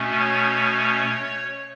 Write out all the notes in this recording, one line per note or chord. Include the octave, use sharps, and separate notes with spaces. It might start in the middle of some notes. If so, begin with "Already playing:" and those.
Already playing: B2 A3 C#4
C#5